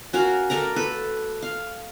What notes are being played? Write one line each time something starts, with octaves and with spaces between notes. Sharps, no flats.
C#4 F#4 A#4 F5
A3 A#4 D5 A#5
A4 B4
F5